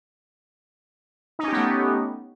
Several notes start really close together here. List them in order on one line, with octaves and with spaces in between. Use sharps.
D#4 C#4 G4 B3 A3